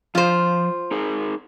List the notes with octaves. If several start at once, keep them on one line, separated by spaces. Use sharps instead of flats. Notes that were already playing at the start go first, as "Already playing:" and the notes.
F3 F4 C5
D#4 G#4 A#4